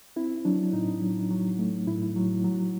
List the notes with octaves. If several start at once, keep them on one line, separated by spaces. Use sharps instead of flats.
C4 E4
F#3 D4
A2 D#4
F#3
F#3
A3
A2 E4
F#3
F#3